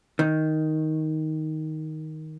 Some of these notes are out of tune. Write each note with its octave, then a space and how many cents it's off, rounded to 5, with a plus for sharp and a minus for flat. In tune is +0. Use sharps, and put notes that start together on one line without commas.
D#3 +5